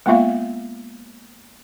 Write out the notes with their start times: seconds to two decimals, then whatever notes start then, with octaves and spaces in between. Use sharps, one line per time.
0.06 G#3 A#3 B3 F4 E5 F5